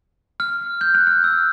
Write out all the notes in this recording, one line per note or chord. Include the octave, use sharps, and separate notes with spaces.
F6
G6
F#6
F6
E6